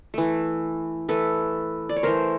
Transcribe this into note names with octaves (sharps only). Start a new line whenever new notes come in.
E3 A3
E3 A3 A4 B4
D5
C#5
E3 A3 A#4 C5